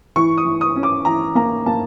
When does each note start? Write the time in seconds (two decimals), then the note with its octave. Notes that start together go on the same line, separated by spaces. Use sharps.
0.16 E3 C#6
0.37 D#6
0.46 E3
0.61 D#6
0.76 C#4
0.83 D6
1.05 E3 A#5
1.35 A#3 A#5
1.66 A#3 A5